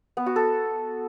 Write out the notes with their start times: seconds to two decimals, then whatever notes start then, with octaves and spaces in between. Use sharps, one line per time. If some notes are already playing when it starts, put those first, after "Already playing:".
0.17 B3
0.26 F#4
0.36 A4